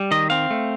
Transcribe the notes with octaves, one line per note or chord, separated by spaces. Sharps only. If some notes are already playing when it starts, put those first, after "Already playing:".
Already playing: G3
D#3 D#5
C4 F5
A3